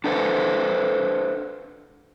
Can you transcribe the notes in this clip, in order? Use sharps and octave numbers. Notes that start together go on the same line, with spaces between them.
D4 A4 B4 C5